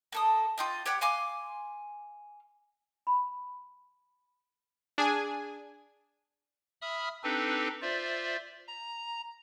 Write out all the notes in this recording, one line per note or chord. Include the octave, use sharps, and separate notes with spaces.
A#3 A4 D#6
F4 G4 D#5
G4 C#5 F#5 G5
F5 G#5 C6 D6
B5
D4 G#4 G#5
E5 B5 D#6 F6
C4 D4 D#4 G4 A4 B4
F4 C5 D5 E5
A#5